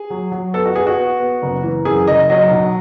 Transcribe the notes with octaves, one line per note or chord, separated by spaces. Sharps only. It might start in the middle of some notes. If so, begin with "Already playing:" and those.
Already playing: G#4
F#3
F#3
B3 A4
F#4
B3 G#4
F#4
B3
B3
F#1
E3
F#2 G#4
F#1 D#5
F#3 D#5
B1